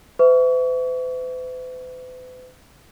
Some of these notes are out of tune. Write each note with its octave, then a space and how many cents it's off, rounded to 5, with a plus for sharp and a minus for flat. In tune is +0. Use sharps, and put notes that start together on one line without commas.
B4 +45 E5 +0 C#6 +35